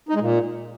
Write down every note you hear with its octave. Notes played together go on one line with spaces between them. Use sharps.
D#4
G#3
A#2